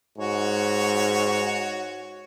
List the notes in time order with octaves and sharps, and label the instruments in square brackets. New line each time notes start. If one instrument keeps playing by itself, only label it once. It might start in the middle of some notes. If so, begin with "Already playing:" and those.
[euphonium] G#2 [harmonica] F#4 C#5